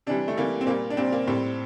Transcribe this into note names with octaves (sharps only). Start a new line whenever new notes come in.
C3 E3 G3 D4
A3
C3 E3 G3 A#3
C4
A#2 G3 A#3
D4
A#2 G3 C4
A#3
A2 G3 C4